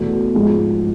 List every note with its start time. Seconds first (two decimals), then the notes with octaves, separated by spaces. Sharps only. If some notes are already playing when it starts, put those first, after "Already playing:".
Already playing: E2 B2 A3
0.34 G#2 F3 G#3